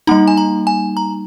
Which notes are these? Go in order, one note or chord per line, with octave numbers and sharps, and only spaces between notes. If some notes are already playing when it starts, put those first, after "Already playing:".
G3 A#3 D#4 A#5
G#5
A#5
G#5
A#5